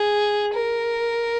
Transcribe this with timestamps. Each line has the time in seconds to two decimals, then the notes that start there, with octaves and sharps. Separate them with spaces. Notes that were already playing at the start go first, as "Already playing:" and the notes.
Already playing: G#4
0.54 A#4